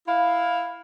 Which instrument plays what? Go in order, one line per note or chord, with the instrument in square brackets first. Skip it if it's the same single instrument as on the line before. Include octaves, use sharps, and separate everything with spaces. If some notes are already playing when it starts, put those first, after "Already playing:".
[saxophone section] E4 F5